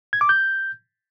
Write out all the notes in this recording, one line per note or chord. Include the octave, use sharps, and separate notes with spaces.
G#6
D6
G6